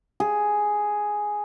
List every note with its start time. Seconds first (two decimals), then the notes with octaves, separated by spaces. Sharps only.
0.20 G#4